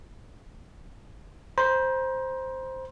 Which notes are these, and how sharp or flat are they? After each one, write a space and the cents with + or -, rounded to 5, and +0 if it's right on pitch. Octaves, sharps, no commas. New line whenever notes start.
C5 +0 A#5 +40